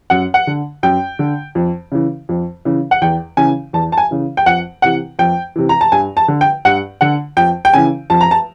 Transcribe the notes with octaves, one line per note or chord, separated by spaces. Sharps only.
F#2 F#5
F#5
D3
F#2 G5
D3
F2
C#3 E3
F2
C#3 E3
F#5
E2 G5
C#3 E3 G#5
E2 A5
A5
G#5
C#3 E3
G5
F2 F#5
C3 E3 F#5
F2 G5
C3 E3
A#5
A5
G2 G#5
A5
D3
G5
G2 F#5
D3 F#5
F2 G5
G5
C#3 E3 G#5
F2 A5
A#5
A5